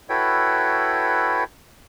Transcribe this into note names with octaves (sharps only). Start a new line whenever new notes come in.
E4 F#4 A4 B4 C#5 G5